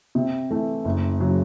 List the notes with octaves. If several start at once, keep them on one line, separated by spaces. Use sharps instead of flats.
C3
E3 A3
F#1
C#3 F#3